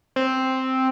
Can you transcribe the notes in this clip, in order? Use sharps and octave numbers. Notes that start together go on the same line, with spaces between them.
C4